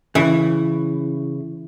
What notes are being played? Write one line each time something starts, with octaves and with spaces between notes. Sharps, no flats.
C#3 E3